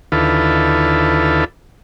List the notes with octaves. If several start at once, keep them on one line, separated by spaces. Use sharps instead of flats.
D#2 D3 E4 F4 A4 B4